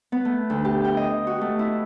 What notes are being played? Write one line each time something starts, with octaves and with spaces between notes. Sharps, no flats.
B3
A3
D2
G4
G5
D#5
F#4
A3
E4